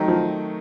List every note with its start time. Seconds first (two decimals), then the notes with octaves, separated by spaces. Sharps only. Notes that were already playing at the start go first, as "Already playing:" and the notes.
Already playing: D#3 F#3 A3 C4 D#4
0.08 F3